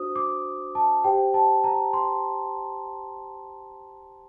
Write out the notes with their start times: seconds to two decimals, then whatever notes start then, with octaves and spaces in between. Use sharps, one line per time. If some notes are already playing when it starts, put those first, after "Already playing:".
Already playing: D4 F#4 C5 D#6
0.16 D6
0.75 A5
1.04 G4 C5 G5
1.34 A5
1.64 A#5
1.93 C6